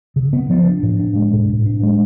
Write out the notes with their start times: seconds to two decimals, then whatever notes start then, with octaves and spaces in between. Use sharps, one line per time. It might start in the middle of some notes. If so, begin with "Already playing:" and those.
0.16 C#3
0.33 B3
0.50 F3
0.67 D4
0.83 A2
0.99 D4
1.15 G#3
1.33 A2
1.49 A2
1.66 D4
1.83 G#3